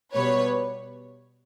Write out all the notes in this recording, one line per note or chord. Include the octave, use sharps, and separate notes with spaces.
B2 G3 B3 B4 C#5